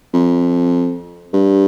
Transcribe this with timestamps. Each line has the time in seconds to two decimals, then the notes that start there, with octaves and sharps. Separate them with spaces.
0.14 F2
1.33 G2